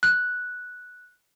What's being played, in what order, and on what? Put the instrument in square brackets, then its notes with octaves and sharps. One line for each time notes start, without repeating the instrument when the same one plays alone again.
[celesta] F#6